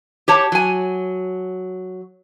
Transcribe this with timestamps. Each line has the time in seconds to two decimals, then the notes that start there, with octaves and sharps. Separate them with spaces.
0.28 G4 C#5 A5
0.52 F#3 G#5